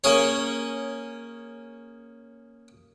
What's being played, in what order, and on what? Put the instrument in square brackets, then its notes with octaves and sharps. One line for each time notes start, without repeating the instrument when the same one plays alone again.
[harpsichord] A#3 C#4 G#4 C#5